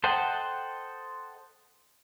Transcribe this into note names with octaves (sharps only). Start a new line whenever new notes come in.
A4 C5 D#5 F#5 G5